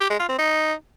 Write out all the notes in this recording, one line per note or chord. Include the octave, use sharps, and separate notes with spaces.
G4
G#3
F4
C4
D#4